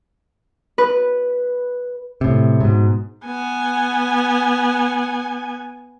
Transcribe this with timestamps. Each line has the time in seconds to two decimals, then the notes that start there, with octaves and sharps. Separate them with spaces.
0.78 B4
2.21 A2 C3
2.61 G#2 B2
3.25 B3 G#5